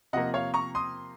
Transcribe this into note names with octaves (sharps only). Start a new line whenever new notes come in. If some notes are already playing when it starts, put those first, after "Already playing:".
C3 F3 A#3 D#5 F#5
C#5 F5
A#5 C#6
C6 D#6